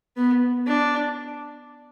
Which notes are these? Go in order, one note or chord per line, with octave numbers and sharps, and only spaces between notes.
B3
D4